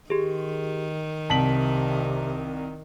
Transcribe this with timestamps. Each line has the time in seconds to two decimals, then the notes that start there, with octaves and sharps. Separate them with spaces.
0.10 D#3 G4 G#4
1.30 C2 C3 A5 B6 F#7